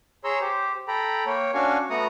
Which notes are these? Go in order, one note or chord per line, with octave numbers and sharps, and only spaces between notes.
G#4 C#5 A#5 C6 E6
G4 C5
A4 G5 A#5 B5
A#3 C#5 G5
C#4 D4 F#4 F5 G#5 C#6
A3 B3 F#4 F#5 A#5 D#6